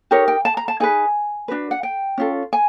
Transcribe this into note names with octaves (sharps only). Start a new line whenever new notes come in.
D#4 G4 A#4 C#5
G5
A5
A#5
A5
D#4 G#4 B4 G#5
D4 F#4 B4
F#5
G5
C#4 F4 A4
G#5